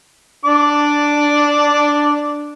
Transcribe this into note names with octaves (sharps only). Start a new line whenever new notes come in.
D4 D6